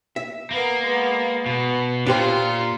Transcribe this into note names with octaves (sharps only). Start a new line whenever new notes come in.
E5
A#3 B3 A#4
G#3 B3
B2 B3
A#2 D4 F4 G4 C5